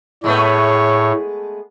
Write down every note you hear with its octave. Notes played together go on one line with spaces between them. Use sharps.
A2 G#3 A3 B3 C#5